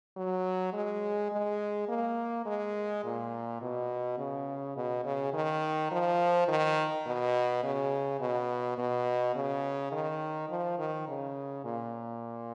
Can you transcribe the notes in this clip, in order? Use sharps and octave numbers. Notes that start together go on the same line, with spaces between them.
F#3
G#3
G#3
A#3
G#3
A#2
B2
C#3
B2
C#3
D#3
F3
D#3
B2
C#3
B2
B2
C#3
D#3
F3
D#3
C#3
A#2